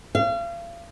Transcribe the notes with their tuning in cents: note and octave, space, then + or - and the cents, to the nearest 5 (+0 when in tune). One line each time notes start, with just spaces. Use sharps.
F5 -35